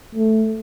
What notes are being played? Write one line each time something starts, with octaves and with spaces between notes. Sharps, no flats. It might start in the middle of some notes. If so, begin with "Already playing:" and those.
A3